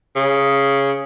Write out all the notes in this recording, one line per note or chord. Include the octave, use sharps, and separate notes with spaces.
C#3